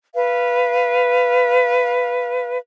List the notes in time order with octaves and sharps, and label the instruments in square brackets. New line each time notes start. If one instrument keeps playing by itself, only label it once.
[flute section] B4 F5